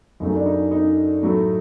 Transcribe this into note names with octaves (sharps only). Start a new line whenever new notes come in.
F#2 C#3 F#3 A3 D#4
D4
D#4
D#4
A2 F#3 A3